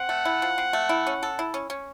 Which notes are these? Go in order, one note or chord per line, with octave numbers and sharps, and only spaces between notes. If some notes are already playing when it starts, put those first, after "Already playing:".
Already playing: C4 F#5
A3
E4
F3
C4
A3
E4
C#4
A4
E4
C#4
C#4